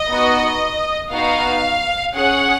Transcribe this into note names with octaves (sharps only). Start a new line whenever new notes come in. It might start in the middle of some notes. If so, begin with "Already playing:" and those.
Already playing: D#5
B3 D#4 F#4
B3 D#4 F#4 F5
C#4 G#4 F#5